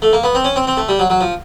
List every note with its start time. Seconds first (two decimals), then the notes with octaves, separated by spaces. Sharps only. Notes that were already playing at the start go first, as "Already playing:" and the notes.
0.02 A3
0.13 A#3
0.24 B3
0.35 C4
0.44 C#4
0.56 C4
0.67 C4
0.77 A3
0.89 G3
0.99 F#3
1.10 F#3
1.21 F3